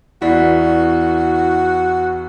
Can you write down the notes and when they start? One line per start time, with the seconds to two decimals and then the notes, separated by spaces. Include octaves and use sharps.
0.22 E2 B3 E4 F#4 D5 B6 C7